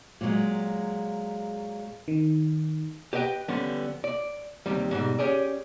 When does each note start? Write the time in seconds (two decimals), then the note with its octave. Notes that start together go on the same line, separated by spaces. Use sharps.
0.21 A#2 F#3 G#3
2.08 D#3
3.13 G4 B4 D#5 F5 G5
3.48 D3 F3 G3 B3 C#4
4.04 D5
4.66 D#2 C3 G3
4.91 G#2 B2 G3
5.19 C#4 G4 G#4 D5